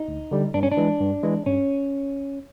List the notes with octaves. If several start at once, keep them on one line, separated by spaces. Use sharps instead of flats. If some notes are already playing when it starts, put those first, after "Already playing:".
Already playing: D#4
D2
D3 G3
G2 D4
C#4
D4
E3 G#3
G2
E3 G#3
G2 C#4